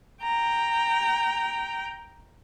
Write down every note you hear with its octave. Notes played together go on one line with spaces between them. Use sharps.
G5 A#5